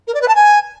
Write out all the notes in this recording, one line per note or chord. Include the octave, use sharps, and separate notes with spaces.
A#4
D5
B4
A5
G#5